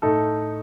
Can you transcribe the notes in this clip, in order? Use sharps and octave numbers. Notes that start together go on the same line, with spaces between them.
A2 A3 D#4 A4